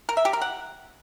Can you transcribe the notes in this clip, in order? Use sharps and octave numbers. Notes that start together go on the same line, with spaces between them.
A#4
E5
G4
A#4
F#5